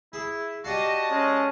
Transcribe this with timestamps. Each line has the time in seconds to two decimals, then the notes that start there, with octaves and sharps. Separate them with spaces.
0.13 E4 G#4
0.64 F#4 G4 D5 D#5 F5 A5
1.11 G#3 C#4